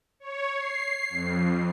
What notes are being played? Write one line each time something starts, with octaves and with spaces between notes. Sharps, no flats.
C#5
C7
F2